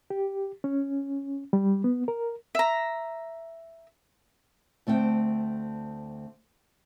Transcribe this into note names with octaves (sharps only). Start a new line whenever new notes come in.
G4
C#4
G3
B3
A#4
E5 A#5
D2 A3 C4 G5